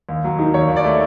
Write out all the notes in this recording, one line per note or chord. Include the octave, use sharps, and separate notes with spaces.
D#2
F#3
D#3
D#2 C#5
D#2
D5
A3